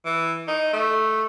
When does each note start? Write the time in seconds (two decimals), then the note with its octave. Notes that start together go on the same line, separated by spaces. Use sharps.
0.06 E3
0.48 D#4
0.73 A3